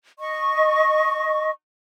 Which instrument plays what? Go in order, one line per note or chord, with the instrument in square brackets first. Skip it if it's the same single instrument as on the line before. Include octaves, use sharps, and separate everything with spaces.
[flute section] D#5 C#6